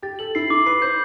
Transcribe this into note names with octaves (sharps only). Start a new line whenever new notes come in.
G4 A6
A4 F#7
E4 C7
E4 D6
B4 C7
C5 G6